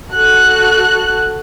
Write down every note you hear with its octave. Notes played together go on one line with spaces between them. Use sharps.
F#4 A4 F#6